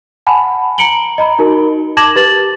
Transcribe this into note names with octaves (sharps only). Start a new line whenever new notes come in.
F#5 G#5 A5 B5
A#5 C#7 D7 F#7 G7
D#5 A#5 B5
D#4 F#4 A#4
A5 D6 G#6 A#6 E7 F#7
G4 B4 A6 F#7